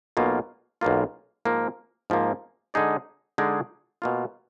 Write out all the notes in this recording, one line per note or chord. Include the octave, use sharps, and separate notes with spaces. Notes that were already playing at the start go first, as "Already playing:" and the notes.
B1 B2 A#3 F4
B1 B2 A#3 F4
G#2 F3 A#3
G#2 F3 A#3
D3 G#3 D#4 G#4 D5
D3 G#3 D#4 G#4 D5
B2 A#3 F4